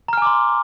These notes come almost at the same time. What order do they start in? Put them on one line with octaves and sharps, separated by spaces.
A#5 F6 G#5 D6 C6